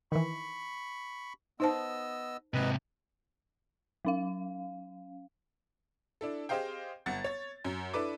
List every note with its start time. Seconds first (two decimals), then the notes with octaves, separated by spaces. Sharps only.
0.12 D#3 E3 B5 C#6
1.60 B3 D#4 C5 D#5 A5 E6
2.54 G#2 C3 B4 D#5
4.05 F#3 C#4 F5
6.21 D4 E4 A4
6.49 G4 G#4 C5 D#5 F5 G5
7.06 G1 F#5 A6
7.24 C#5 A6
7.65 F#2
7.94 D4 E4 A4 B4 D6